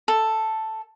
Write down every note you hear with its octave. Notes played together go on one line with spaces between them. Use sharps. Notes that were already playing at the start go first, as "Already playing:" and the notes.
A4